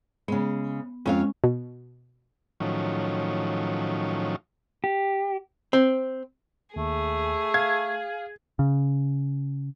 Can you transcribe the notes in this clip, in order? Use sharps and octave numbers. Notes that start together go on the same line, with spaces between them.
C#3 G#3 B3
F2 G#3 C#4 C#5 F5
B2
A2 D#3 F3 F#3 C#4
G4
C4
D#2 A3 G#4
F5 G#6
C#3